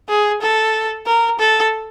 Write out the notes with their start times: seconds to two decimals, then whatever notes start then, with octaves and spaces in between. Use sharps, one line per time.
0.09 G#4
0.41 A4
1.06 A#4
1.39 A4